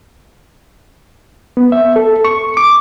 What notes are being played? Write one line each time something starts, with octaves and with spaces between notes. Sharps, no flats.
B3
E5
A4
C#6
D6